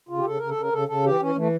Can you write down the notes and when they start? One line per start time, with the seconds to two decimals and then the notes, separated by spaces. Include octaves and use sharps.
0.09 C#3 F4
0.18 G4
0.24 C#3 A4
0.37 C#3 A#4
0.49 A4
0.56 C#3 A#4
0.73 C#3 A4
0.88 C#3 A4
1.04 E3 G4
1.20 E3 C#4
1.35 E3 A3